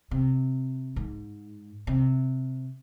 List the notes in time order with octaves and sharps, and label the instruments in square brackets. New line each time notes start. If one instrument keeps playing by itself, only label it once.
[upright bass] C3
G#2
C3